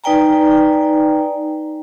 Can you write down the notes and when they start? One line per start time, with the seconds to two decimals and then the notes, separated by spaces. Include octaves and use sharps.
0.04 D#4 B4 D5 G5 G#5 A#5